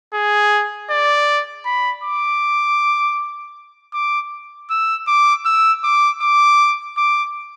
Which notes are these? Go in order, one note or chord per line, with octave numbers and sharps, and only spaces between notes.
G#4
D5
B5
D6
D6
E6
D6
E6
D6
D6
D6